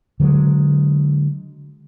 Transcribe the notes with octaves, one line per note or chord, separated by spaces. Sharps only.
D3 F#3 G#3